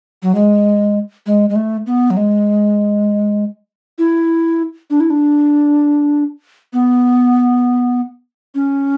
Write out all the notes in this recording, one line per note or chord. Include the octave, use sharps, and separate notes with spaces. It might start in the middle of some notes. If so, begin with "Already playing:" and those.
F#3
G#3
G#3
G#3
A3
B3
F#3
G#3
E4
D4
E4
D4
B3
C#4